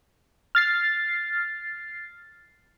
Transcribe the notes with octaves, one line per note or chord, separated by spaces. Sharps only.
F6 A6 C7